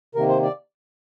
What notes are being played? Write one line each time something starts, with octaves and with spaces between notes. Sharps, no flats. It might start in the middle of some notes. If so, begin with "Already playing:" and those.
C3 D#3 A#3 A#4
C5
D5